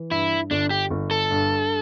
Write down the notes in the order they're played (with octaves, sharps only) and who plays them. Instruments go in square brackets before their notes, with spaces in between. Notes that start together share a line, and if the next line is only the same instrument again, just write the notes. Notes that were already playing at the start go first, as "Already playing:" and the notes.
Already playing: [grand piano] E3
[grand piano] G2 [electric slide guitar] E4
[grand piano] G1 [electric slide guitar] D4
[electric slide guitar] G4
[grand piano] G1
[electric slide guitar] A4
[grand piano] G2